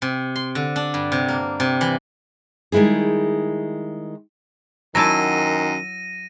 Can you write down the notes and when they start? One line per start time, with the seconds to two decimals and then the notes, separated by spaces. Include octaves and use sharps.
0.02 C3
0.36 C6
0.55 D3
0.76 D4
0.94 G2
1.12 C3
1.28 A#3
1.60 C3
1.81 E3
2.72 D#3 G3 G#3 E4 G#4
4.95 F#2 D#3 F#3 E4 A5 A#6 D#7